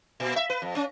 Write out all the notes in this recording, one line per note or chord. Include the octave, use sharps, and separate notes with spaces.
A#2
E5
B4
F2
C#4